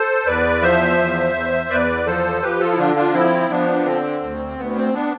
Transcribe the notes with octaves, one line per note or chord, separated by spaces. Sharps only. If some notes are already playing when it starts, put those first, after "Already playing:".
Already playing: A4 C5
E2 B4 D5
F3 C5 E5
E2
E2
E2 B4 D5
F3 A4 C5
F3 G4 B4
F4 A4
E4
D3 D4 F4
D4 F4
F3 C4 E4
F3 B3 D4
D3 C4
D2
D2 B3
C4
B3 D4